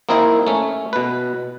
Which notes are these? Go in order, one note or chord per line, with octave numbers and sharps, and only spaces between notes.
A#3 C4 D#4 E4 A#4
A3 C#4
B2 B4